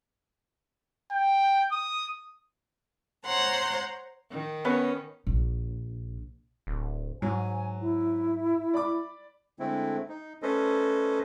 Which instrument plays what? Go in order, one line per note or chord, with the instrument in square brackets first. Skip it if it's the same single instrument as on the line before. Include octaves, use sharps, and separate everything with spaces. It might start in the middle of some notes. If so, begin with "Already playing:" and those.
[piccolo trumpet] G5
D#6
[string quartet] C5 C#5 F#5 A#5 C6
[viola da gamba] D#3
[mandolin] B3 [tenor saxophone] C#4
[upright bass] A#1
[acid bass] D1
[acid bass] G#2 [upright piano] F#3 [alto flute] G#5
[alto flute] E4
[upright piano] D5 B5 D6
[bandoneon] D3 G#3 A3 C4 E4
D#4
A3 C#4 A4 B4 C5 D#5